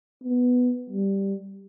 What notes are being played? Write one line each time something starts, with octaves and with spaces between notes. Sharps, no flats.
B3
G3